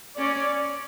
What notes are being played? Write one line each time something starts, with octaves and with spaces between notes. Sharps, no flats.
C#4 D5